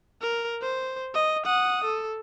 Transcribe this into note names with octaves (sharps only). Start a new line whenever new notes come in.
A#4
C5
D#5
F#5 D#6
A4